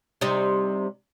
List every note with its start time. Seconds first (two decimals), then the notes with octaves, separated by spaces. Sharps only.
0.21 C3 G3 D#4